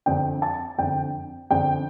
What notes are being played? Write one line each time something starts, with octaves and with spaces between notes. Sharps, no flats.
F2 D3 G5
A5
F2 D3 G5
F2 D3 G5